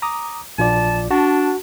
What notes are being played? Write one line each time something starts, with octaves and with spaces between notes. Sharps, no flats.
A#5 D6 D#6
A#1 F4 D5 A5
D4 F#4 A5